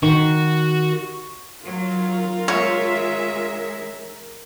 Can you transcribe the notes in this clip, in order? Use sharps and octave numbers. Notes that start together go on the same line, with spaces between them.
D#3 F#4 C#6
F#3 F4 A#4
G#3 C#5 E5